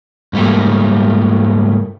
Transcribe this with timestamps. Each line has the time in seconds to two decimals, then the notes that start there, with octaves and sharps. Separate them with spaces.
0.33 G#2 G3 A3 A#3